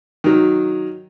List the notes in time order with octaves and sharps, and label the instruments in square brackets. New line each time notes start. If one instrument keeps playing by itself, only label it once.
[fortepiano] D#3 F#3